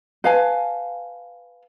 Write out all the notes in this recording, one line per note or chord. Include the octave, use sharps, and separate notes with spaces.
B4 F5 G#5 A5